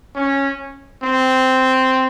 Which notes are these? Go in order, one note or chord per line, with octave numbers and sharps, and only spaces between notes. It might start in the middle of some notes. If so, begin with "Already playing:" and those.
C#4
C4